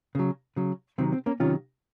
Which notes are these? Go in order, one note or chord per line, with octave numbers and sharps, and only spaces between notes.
C#3 F#3
C#3 F#3
C3 D#3 F#3 C4
C4
A#3 C#4
C3 D#3 F#3 C#4 F4